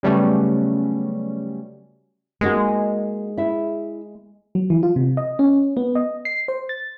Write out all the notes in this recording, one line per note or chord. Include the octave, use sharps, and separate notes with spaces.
C#3 F#3 G3 A3 B3 C#4
G#3 A#3 D#4 F#4
E4 E5
F#3
E3
F4
C3
D#5
C#4
B3
D#5
C7
C5
A6